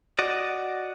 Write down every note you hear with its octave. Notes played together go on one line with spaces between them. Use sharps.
F#4 D5 D#5